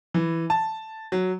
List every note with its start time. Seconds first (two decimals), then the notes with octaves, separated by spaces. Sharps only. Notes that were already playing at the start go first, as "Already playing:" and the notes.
0.14 E3
0.50 A5
1.12 F#3